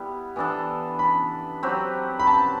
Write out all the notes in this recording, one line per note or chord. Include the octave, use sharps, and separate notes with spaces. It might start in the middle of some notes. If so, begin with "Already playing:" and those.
Already playing: G3 B3 E4
E3 B3 D4 A4
B5
F#3 C4 G4 B4
B5
A5